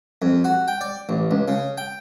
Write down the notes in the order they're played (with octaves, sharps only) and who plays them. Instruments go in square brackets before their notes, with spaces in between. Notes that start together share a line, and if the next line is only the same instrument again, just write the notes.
[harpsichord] F2
F#4
G5
D5
A1
C#2
C#3
G5